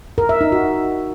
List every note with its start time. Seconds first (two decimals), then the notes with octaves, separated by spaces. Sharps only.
0.18 A#4
0.29 E5
0.41 D#4
0.52 F#4